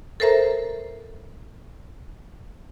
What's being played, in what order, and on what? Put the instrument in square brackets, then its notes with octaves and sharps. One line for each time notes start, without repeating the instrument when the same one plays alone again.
[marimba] A4 A#4 C5 E5 A#5